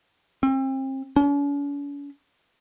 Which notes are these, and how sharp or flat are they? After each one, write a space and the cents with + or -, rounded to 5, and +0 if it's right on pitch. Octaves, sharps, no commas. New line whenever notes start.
C4 +35
C#4 +45